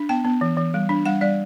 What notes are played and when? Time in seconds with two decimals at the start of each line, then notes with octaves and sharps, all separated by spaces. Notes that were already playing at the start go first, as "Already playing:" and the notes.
Already playing: D4
0.09 B3 G5
0.25 B3
0.41 E3
0.57 E3
0.74 G3
0.89 D4
1.06 G3 F#5
1.21 G3 D5